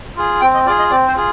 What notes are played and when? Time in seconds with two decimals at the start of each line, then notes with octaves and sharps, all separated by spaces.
0.16 F4 G#4
0.41 C4 G5
0.54 D#5
0.66 F4 D5
0.69 G#4
0.79 D#5
0.91 C4 D5
1.08 C5
1.16 F4 G#4